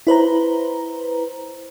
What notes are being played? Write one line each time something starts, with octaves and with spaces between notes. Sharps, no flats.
E4 B4 C5 A#5